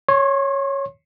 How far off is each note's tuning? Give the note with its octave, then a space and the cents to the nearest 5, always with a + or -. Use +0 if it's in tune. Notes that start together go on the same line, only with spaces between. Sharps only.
C#5 -5 C6 +40